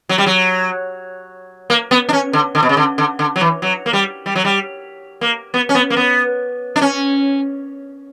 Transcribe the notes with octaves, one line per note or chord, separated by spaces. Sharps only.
F#3
G3
F#3
A#3
B3
D4
C#4
D3
D3
B2
C#3
D3
D3
D3
F#3
E3
F#3
A#3
G3
G3
F#3
G3
A#3
B3
C#4
B3
A#3
B3
D4
C#4